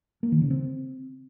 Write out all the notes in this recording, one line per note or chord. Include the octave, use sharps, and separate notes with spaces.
A#3
D#3
C#3
C4